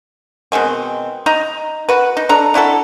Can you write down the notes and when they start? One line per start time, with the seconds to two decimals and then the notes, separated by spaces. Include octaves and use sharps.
0.52 B2 D#3 G#3 C4
1.26 D#4 D#5 A#5
1.89 F#4 B4
2.17 D#4
2.29 D4 A4 A#5
2.54 D4 E4 F#4 A4